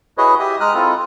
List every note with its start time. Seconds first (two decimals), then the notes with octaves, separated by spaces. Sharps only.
0.18 E4 F#4 G#4 B4 C#5 D#5
0.40 G4 D#5 E5 D#6
0.60 G#3 A#5 D#6 F6 F#6
0.74 C4 E4 F4 A4